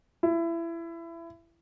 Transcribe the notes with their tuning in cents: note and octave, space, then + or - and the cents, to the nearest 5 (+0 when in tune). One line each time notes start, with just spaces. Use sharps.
E4 +25